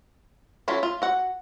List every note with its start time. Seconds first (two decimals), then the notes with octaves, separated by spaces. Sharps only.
0.68 F#3 C#4 E4 F4 A4
0.83 F4
1.02 F#4 F#5